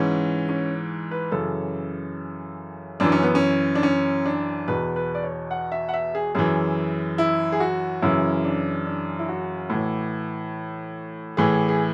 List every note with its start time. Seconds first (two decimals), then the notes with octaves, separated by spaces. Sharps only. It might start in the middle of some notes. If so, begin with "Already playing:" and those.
Already playing: G#2 E3 C#4
0.49 C#4
1.11 B4
1.32 F#2 C#3 E3 A4
3.00 F#2 E3 D4
3.12 C#4
3.23 B3
3.35 C#4
3.75 D4
3.83 C#4
4.26 D4
4.68 E2 B2 B4
4.96 B4
5.15 D5
5.23 C#5
5.51 F#5
5.72 E5
5.89 F#5
5.94 E5
6.15 G#4
6.35 F#2 E3 G#4
7.18 E4
7.52 G#4
7.60 F#4
8.02 F#2 C#3 E3 E4
8.44 D4
8.86 D4
9.19 E4
9.29 F#4
9.70 A2 E3
11.37 A2 E3 G#4
11.69 G#4